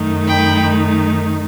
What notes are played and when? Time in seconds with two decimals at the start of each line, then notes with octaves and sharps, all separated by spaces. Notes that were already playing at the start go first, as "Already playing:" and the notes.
Already playing: F#2 D#3 A3 D#4
0.27 G5 B5